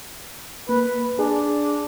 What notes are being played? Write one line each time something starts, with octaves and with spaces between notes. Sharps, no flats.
A#3 B4
D4 G#4